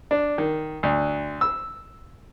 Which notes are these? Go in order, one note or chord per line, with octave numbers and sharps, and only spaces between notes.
D4
D#3
D2
E6